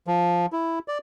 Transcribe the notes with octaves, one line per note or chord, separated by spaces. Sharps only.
F3
E4
D5